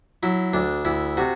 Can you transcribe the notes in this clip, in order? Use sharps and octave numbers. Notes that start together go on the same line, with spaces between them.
F#3 E4
D2 D4
D2 E4
C3 F#4